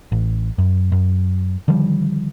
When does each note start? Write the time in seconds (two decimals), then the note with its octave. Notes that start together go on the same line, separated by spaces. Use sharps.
0.12 A1
0.58 F#2
0.92 F#2
1.68 D3 D#3 F3 G3